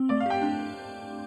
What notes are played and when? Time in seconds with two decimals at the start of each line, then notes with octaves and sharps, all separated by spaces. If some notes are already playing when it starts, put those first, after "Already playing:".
Already playing: C4
0.09 A3 D5
0.20 F5
0.26 G4 G5
0.42 D4